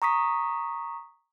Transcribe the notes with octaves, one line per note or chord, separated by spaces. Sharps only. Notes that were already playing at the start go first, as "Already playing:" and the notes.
A#5 C#6 D#6 B6